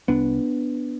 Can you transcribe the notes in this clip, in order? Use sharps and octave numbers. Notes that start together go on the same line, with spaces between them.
C2 B3 D4